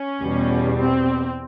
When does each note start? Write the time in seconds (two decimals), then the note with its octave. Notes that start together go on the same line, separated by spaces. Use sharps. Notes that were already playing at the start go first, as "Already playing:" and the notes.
Already playing: C#4
0.21 E2 B2 G3
0.78 C4